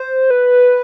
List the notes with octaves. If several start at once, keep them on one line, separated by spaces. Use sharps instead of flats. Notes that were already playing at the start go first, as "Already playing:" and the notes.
Already playing: C5
B4